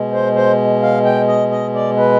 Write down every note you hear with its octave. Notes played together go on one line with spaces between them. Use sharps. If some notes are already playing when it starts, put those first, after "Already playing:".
Already playing: B2 G#3
C5
C5
F5
G5
D#5
D#5
D5
B4